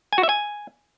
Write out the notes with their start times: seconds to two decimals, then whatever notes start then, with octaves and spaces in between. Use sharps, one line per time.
0.13 G#5
0.18 F#4
0.23 E5
0.29 G#5